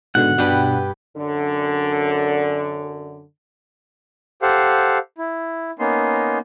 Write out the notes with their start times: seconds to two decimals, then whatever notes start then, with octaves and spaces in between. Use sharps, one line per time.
0.15 G#2 B2 D3 F#5
0.38 G2 B2 D4 G4 B4
1.17 F#2 D3
4.42 G4 A4 C5 F5 F#5
5.18 E4
5.79 A#3 B3 C#4 D#4 C6